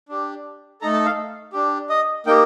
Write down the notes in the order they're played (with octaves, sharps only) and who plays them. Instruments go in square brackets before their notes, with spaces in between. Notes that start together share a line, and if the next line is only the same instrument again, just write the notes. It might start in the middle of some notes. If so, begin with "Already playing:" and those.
[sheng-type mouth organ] D4 G4
A3 D#4 A4 A#5
A5
F5
D4 G4
D#5
A#3 D#4 G4 G5